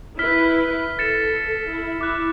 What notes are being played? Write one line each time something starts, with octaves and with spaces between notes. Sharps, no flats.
E4 B4 F6 B6
A4 A6 C#7 E7
E4
E4 D6 F#6